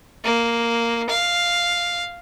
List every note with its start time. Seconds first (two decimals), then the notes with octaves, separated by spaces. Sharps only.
0.24 A#3
1.09 F5